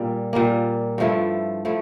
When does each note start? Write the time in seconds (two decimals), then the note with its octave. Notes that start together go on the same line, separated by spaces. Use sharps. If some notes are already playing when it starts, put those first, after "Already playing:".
Already playing: A#2 G3 A#3
0.33 A#2 G3 A#3
0.98 G2 F3 A3 E4
1.65 F3 A3 E4